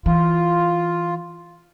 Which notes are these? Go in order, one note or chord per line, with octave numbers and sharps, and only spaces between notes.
E3 F4